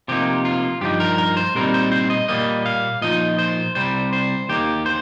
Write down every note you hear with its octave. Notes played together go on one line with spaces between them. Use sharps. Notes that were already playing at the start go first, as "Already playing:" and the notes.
C3 F3 A#3 D#4 G4
F4
G2 F3 D#4 G4
A#4
A#4
C5
A#2 G3 C4 D#4 A#4
C5
C5
D#5
A#2 G3 A#3 D#5
F5
A#2 F3 D#4 D#5
C5
C2 C3 G3 C5
C5
D#2 D#3 A#3 G4
C5